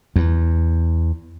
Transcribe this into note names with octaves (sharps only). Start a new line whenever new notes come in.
E2